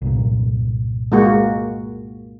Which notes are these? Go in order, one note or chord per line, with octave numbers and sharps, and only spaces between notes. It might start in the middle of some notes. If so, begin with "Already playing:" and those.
C2 G2 A#2
G#3 A#3 F#4